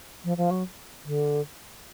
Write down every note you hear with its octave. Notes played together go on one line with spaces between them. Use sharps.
F3
F3
F#3
D3